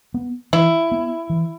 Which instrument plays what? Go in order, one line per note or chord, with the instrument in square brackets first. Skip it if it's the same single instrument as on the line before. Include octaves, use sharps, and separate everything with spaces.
[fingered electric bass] B3
[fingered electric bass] E3 [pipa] E4
[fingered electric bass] B3
E3